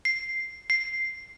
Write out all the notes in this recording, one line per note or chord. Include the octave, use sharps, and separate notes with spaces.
C7
C7